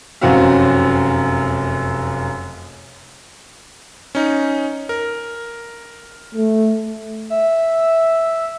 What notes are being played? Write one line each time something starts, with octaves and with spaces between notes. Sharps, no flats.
F1 F#2 C4 C#4 F#4 F5
C#4 D#4
A#4
A3
E5